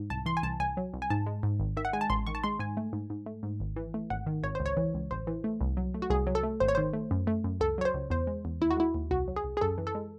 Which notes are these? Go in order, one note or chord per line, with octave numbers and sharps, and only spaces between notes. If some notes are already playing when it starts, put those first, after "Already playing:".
Already playing: G#2
C2 A5
E3 C6
G#5
C2 A5
C2 G#5
F#3
C2
G#5
G#2 A5
G#3
G#2
G#1
D#3 E5
F#5
G#3 G#5
A5
A1 C6
D#3 C#6
A5
G#3 C6
G#2 G#5
A3
G#2
G#2
A3
G#2
G#1
E3
A3
G#1 F#5
D#3
G#1 C#5
C#2 C5
C#5
E3
C#2
A1 C5
E3
A3
C2
F#3
A3
F#4
C2 G#4
F#3
A4
A3
G#1 C5
C#5
D#3 C5
A3
F#2
A3
F#2
C#2 A4
F#3 C#5
C5
C#2
E2 C5
G#3
E2
D#2 E4
F#4
G#3 E4
D#2
C2 F#4
F#3
G#4
C2
G#4
F#2 A4
E3
A4
G#3